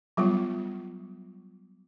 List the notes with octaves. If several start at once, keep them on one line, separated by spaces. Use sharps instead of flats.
F#3 G3 B3 F4